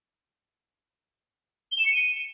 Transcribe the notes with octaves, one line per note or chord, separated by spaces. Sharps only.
G7
E7
C#7
D#7